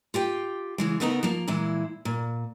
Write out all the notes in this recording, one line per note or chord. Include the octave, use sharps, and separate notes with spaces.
F4 G4 G5
C#3 E3 G#3
C#3 A3 B3 D#4 G#4 A#4
F3 A#3
A#2 E3 G#3 E4
A#2